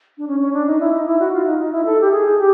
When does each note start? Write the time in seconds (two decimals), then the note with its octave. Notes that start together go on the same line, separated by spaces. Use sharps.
0.18 D4
0.28 C#4
0.40 C#4
0.54 D4
0.67 D#4
0.80 E4
0.93 D#4
1.06 E4
1.20 F#4
1.33 F4
1.46 D#4
1.59 D#4
1.72 E4
1.85 A4
2.01 G4
2.12 G#4
2.38 G4